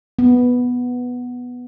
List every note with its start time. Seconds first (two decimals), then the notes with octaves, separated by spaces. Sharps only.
0.19 B3